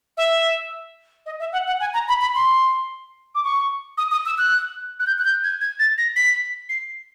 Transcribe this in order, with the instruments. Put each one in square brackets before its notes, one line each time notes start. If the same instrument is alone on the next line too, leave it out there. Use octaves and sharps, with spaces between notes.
[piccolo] E5
D#5
E5
F#5
F#5
G#5
A#5
B5
B5
C6
D6
C#6
D#6
D#6
E6
F#6
F#6
G6
F#6
G6
G#6
G#6
A6
A#6
B6
C7